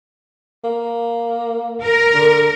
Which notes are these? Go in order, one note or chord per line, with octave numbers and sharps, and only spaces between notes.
A#3
A#4
D3